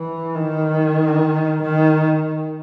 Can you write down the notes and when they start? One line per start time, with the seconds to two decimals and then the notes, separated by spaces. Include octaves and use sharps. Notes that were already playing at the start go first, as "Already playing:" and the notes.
Already playing: E3
0.35 D#3
1.62 D#3